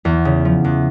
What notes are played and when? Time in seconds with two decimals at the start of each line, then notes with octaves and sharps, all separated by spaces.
0.05 E2
0.25 C#3
0.45 F3
0.64 E2